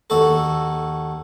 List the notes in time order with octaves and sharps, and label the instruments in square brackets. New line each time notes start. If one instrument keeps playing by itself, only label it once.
[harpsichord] D#2 F#4 A4